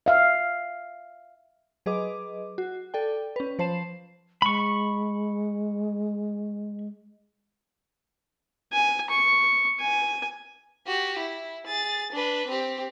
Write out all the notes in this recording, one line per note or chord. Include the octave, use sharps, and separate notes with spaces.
E5 F5
F#3 G#4 B4 D#5 D6
F#4
A4 D5 G5
C#4 B4
F3 C5 A5 C7 E7
G#3 B5 C#6
G#5
C#6
G#5
F#4 G4
E4
G#4 A6
D4 B4
C4 G4